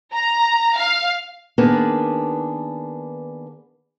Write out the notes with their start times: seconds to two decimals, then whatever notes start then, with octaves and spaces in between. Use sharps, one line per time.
0.14 A#5
0.77 F5
1.58 D#3 A#3 B3 D4 G#4 B4